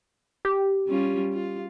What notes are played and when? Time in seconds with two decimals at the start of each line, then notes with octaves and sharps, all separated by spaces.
0.45 G4
0.87 G3 C#4 F4
1.33 F4